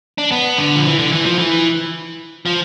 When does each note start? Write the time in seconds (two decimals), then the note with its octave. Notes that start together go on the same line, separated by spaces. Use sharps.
0.18 D4
0.31 B3
0.58 D3
0.75 F3
0.85 E3
0.99 D3
1.12 E3
1.26 F3
1.39 E3
2.46 F3